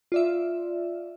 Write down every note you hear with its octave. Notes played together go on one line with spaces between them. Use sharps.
F4 D5 E5